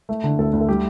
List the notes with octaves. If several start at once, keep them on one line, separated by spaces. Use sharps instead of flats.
A3
D3
D2 A4
D2
A4
G3 G4